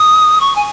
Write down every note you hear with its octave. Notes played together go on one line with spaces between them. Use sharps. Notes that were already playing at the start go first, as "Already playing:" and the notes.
Already playing: D#6
C#6
G#5